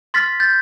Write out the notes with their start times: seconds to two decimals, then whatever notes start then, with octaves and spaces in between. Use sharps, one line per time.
0.14 C6 F6 A6 B6
0.40 G6 A6